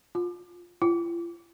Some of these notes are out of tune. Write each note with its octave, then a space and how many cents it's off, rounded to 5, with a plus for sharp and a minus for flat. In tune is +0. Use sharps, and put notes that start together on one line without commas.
F4 +10
F4 -45